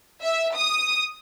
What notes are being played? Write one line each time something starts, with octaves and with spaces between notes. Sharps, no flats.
E5
D#6